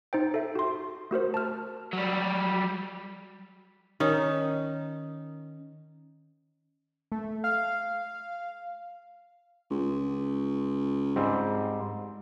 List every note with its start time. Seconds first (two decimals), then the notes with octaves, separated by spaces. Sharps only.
0.13 D#4 C5 G5
0.34 A4 E5
0.55 F#4 C6
1.11 A3 F#4 A#4 C5
1.34 A5 F6
1.93 F#3 G3
4.00 D#3 C#4 D#4
7.12 A3
7.44 F5
9.71 C#2
11.16 G#2 G3 C4